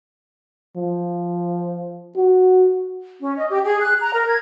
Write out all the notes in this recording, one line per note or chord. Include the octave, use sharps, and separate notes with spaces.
F3
F#4
C#4
D#5
G4
G#4
F#6
A#5
A#4
G#6